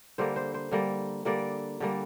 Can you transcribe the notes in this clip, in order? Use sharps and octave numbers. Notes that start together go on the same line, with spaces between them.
D3 G3 A#3 C5
C5
C5
D3 G3 A#3
D3 G3 A#3 D5
D3 G3 A#3